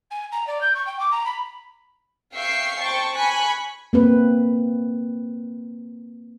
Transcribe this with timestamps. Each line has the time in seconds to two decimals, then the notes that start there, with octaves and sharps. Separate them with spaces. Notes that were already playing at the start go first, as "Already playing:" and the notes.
0.10 G#5
0.32 A#5
0.47 D5
0.60 G6
0.75 C#6
0.86 G5
0.99 D6
1.11 A#5
1.25 B5
2.36 E5 F5 G5 C#6 C7
2.80 C5 G5 A5 C#6
3.16 G#5 B5 C#6 F#6
3.93 A#3 C4 B4